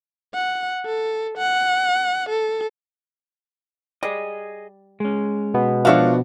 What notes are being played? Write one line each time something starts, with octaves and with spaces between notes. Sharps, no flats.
F#5
A4
F#5
A4
G3 G#4 D#5
G#3 C#4
B2 B3
F3 D4 F#4 C#5 E5 F5